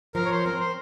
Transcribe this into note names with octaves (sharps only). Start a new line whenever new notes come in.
F3 A#4
C#5
C5
C4 A#4
C5